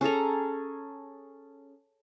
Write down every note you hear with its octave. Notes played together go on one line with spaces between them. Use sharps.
C#4 G#4 A4 A#5